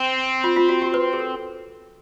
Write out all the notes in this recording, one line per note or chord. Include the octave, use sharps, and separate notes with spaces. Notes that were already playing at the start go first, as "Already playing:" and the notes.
Already playing: C4
F4
F4
F#4
G4
B4
G#4
A4